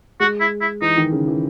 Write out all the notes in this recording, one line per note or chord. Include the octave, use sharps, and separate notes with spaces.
G#3 F#4
E4
E4
E3 D#4
D#3
C#3
E3